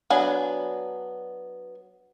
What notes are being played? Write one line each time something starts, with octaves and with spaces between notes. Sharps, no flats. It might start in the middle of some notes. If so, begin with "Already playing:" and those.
F#3 B3 D4 G#5